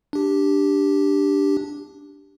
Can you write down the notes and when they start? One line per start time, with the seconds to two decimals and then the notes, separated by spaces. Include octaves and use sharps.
0.13 D4 G4